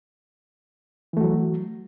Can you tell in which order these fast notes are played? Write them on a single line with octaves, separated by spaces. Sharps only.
E3 A3 F#4 F#3